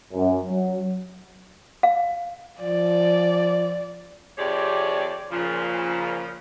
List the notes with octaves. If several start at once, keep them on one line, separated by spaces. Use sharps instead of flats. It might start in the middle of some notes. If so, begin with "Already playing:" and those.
F#2
F#3
F5
F3 D5
F2 C3 G4 G#4 C#5 D5
A#2 C#3 F3